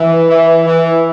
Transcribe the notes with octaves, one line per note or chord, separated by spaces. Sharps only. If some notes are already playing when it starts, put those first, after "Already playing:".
Already playing: E3
E3
E3